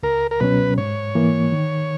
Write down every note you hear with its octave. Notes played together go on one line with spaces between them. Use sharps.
C#2 A#4
A#4
B2 F#3 C#4 B4
G#2 C#5
E3 A#3
D#3